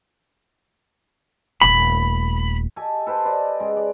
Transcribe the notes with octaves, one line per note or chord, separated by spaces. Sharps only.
D#1 A3 B5
G4 A4 D#5 G#5
A4 B4 C5 G5
B4 D5 D#5
C#3 G#3
D5